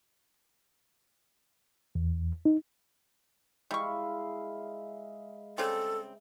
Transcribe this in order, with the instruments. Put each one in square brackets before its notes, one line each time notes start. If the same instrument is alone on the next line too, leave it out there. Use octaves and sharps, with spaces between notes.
[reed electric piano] E2
D#4
[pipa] G3 C#6 [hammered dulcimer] G#3 E4 F5
[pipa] C#3 G3 C4 [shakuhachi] A4